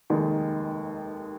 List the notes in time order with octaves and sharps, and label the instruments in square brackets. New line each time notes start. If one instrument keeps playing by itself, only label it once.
[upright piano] F1 D#2 D#3 G#3